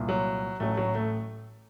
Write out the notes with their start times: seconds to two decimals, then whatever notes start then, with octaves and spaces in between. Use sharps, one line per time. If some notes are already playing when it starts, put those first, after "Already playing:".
Already playing: C2 A#2
0.09 F#3
0.60 A1 A2 F#3 A3
0.77 F#3
0.95 A3